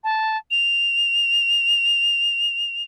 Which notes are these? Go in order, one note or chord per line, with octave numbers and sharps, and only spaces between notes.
A5
F7